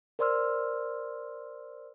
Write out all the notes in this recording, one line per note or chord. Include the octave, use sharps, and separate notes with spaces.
A#4 C5 D5 C6 E6 F6